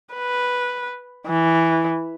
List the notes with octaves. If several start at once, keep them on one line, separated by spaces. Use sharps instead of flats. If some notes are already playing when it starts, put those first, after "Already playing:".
B4
E3